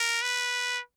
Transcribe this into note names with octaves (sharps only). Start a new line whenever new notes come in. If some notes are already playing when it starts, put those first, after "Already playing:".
Already playing: A#4
B4